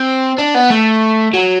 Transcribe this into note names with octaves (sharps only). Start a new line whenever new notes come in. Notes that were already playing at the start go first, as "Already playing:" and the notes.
Already playing: C4
D4
B3
A3
F#3